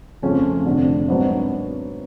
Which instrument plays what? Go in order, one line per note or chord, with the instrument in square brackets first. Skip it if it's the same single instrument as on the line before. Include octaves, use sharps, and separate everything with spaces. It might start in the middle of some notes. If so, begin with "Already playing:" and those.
[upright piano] F2 C#3 F3 A3 C#4
F1 F2 D3
G#1 F#3 B3 D4